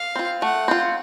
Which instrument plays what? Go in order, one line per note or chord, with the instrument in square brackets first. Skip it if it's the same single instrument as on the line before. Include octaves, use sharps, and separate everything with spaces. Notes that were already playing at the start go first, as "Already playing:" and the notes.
Already playing: [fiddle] F5
[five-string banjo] C4 F4
[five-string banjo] A3 [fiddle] F#5
[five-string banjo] C4 F4